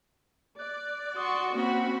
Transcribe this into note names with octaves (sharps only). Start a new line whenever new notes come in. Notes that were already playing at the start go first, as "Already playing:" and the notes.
D5 F#6
F#4 C6 C#6 D#6
A#3 C4 C#4 F#4 B5